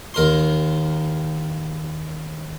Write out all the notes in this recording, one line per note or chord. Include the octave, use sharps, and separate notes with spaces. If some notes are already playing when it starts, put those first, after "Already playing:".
D#2 A#4 C6